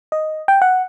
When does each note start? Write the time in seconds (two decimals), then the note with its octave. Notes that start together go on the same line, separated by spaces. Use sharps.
0.12 D#5
0.48 G5
0.62 F#5